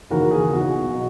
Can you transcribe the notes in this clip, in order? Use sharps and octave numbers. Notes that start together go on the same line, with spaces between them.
D#2 C#3 E3 F#4 A#4
G#4
B1 F#4
B2 F#3